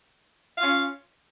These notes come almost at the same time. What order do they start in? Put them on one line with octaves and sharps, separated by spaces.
F5 F4 C#4